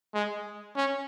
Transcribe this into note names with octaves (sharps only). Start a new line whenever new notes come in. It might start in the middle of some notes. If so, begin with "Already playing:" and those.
G#3
C#4